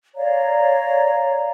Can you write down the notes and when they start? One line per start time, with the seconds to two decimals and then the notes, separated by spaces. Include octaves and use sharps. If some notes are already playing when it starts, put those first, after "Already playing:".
0.15 C#5 D5 F5 A#5